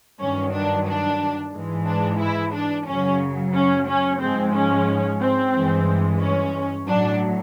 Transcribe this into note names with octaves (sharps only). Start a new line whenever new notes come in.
G2 D#3 F#3 C#4
D4
D4
G#2 E3 G#3
D4
E4
D4
F#2 C#3 F#3 C#4
C#4
C#4
G#2 F3 G#3 C4
C#4
C4
G2 E3 G#3
C#4
A2 F#3 D4